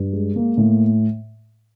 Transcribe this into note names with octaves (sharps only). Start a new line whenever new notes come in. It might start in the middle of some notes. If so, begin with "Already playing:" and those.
Already playing: G2
G#3
A#3
A2